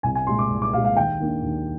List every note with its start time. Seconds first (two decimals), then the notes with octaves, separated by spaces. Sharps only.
0.03 C2 G#5
0.15 G#5
0.27 A#2 G#3 C6
0.39 D6
0.50 C2
0.62 D6
0.73 A#2 F5
0.77 G#3
0.85 F5
0.96 D#2 G5
1.19 D#3 A#3 D4
1.43 D#2